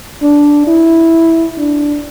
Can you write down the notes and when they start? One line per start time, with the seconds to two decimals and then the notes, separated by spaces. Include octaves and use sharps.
0.22 D4
0.67 E4
1.58 D4